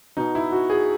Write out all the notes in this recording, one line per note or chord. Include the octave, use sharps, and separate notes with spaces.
B2 D#4
E4
F#4
G#4